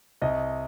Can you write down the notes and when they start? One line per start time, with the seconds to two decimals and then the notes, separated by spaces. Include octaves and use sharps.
0.22 C2 D#5